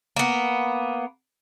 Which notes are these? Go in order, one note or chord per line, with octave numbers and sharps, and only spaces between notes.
A#3 B3